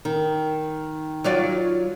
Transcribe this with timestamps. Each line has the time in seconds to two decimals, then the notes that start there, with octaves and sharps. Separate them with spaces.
0.05 D#3
1.24 F#3 F4 D5